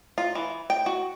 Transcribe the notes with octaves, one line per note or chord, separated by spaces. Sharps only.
F4
E3
G5
F#4